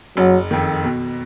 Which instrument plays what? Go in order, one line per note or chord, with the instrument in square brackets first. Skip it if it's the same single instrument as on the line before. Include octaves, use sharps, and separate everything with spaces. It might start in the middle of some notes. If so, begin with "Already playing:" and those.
[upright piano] F#1 [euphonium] F#3
[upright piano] F2 D#3
B2